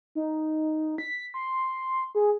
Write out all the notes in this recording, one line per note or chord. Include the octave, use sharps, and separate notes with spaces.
D#4
B6
C6
G#4